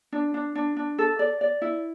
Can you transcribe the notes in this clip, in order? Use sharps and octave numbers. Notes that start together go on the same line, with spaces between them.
D4
D4
D4
D4
A4
D5
D5
E4